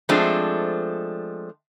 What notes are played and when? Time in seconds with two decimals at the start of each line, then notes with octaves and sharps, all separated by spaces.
0.09 F3 G#3 A3 C4 D4